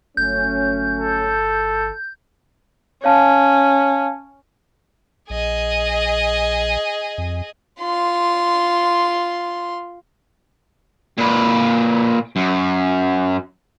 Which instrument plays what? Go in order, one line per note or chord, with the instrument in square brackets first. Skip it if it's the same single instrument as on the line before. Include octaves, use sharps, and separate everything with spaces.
[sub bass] G1 [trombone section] F#3 A3 C#4 [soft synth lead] G6
[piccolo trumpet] A4
[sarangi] C#4 [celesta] C#5 F5 A5
[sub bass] A#1 [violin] G#4 D#5
[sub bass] F2
[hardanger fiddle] F4 C6
[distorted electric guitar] A#2 B4
F#2